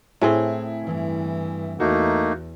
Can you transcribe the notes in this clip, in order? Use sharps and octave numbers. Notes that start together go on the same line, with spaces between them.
A2 C4 E4 G#4
G2 E3
E2 A3 A#3 D#4 F#4